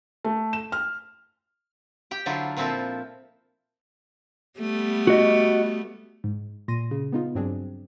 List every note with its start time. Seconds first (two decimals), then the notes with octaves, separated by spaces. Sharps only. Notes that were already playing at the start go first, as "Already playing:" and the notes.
0.25 A3
0.53 E7
0.72 F6
2.11 G4 G5
2.26 D3 F#3 D4 E4 F4 A4
2.57 A#2 F3 C4 E4 F4 A4
4.59 G3 A3 B3
5.07 F#4 D#5
6.24 G#2
6.68 A#2 C6 A#6 D#7
6.91 C#3
7.12 B3 D#4 F4
7.35 G2 F#3 C4 D4 G#4